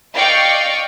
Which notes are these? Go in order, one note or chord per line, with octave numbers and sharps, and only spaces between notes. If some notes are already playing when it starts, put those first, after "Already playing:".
D5 D#5 F5 G5 C#6